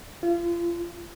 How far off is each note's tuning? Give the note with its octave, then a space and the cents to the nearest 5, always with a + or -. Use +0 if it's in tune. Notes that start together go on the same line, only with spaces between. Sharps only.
F4 -30